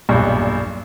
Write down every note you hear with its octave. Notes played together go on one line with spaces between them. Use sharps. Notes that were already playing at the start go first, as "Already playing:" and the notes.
B1 E2 G2 A#2